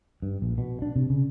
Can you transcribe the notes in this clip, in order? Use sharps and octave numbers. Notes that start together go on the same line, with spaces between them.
G2
A#1
B2
D4
C3
C#3